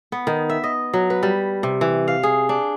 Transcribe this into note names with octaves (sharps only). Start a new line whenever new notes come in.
B3
D#3
E5
D#5
F#3
B4
G3
C3
E3
F5
G#4
D4